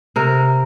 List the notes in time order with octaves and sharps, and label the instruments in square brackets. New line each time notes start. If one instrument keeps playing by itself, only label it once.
[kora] C3 A#4